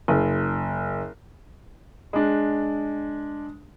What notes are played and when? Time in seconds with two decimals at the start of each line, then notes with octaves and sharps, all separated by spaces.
0.08 F#1
2.13 G#3 D4